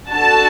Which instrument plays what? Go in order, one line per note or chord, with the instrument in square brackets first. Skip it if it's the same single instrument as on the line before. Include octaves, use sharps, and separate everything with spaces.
[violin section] D4 F#4 A4 A5